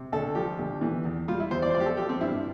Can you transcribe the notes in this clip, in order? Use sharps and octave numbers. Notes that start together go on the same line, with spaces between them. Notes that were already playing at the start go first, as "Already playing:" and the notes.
Already playing: C3
D2 A4
F3 G4
D2
E3
E2
G3 F4
E4
E2 C5
D5
C5
F3 D5
G4
A4
F3 G4
C4
G2 E4